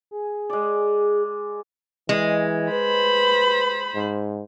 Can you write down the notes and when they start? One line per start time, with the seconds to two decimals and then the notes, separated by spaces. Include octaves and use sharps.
0.11 G#4
0.50 G#3 D5
2.09 E3 G#3
2.72 B4 C5 B5
3.95 G#2